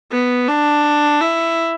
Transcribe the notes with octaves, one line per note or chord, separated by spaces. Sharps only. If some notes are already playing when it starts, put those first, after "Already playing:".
B3
D4
E4